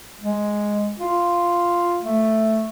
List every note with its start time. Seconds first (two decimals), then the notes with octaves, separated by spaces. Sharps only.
0.21 G#3
1.00 F4
2.02 A3